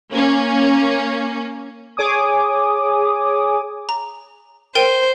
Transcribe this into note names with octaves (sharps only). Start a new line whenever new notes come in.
A#3 C#4
G#4 C#5 G#5 D6 D#6
A#5
A#4 C5 G5 D#7